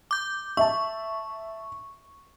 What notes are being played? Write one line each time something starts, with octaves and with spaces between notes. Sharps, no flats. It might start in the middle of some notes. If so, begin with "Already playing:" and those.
D6 G6
E5 A5 C#6